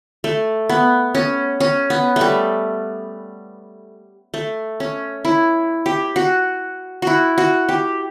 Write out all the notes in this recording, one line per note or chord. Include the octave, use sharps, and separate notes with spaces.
A3
B3
C#4
C#4
B3
G3 A3
A3
C#4
E4
G4
F#4
E4 F#4
F#4
G4